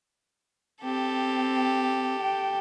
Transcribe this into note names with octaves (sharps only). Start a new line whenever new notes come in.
C4 G4 A4
G5